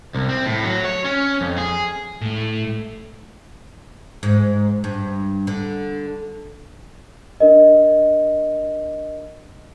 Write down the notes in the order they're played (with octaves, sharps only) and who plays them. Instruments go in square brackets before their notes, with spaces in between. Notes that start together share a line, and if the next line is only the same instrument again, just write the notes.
[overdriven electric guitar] C2
C4
A2
F#3
C#5
C#4
F2
G#4
[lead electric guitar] A2 A3
[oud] G#2
G2
D3
[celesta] D4 A#4 D#5